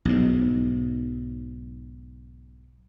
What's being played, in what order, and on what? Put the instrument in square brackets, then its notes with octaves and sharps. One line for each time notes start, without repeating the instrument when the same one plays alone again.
[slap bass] B1 G#2